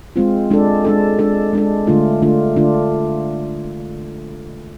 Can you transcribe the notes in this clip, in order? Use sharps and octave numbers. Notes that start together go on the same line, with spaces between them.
G#3 C4 F4
G#3 D4 A4
G#3 D4 A4
G#3 D4 A4
G#3 D4 A4
D3 A3 D4 F4
D3 A3 D4 F4
D3 A3 D4 F4